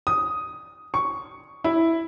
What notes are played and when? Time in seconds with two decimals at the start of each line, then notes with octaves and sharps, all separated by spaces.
0.07 D#6
0.94 C#6
1.64 E4